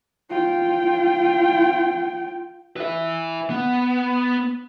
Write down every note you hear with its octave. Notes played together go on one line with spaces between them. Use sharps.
F4 G5
B4 E5
B3